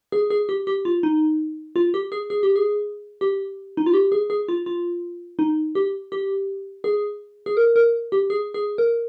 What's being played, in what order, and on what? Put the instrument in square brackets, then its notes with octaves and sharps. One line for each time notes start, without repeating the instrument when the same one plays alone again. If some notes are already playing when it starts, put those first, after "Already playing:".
[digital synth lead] G#4
G#4
G4
G4
F4
D#4
F4
G4
G#4
G#4
G4
G#4
G4
D#4
F4
G4
G#4
G#4
F4
F4
D#4
G4
G4
G#4
G#4
A#4
A#4
G4
G#4
G#4
A#4